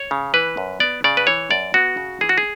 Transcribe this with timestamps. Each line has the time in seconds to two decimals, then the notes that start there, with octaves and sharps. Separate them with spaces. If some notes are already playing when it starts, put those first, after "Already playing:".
Already playing: C#5
0.11 C#3
0.34 E3 B4
0.57 F#2
0.80 B3 D5
1.04 C#3 D5
1.17 B4
1.27 E3 C#5
1.50 F#2 D5
1.74 B3 F#4
1.97 C#3
2.21 E3 G#4
2.29 F#4
2.38 G#4